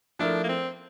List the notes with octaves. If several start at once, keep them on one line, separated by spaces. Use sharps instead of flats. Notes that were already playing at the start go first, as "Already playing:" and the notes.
F3 A3 D4 E4 A#4
A#3
C4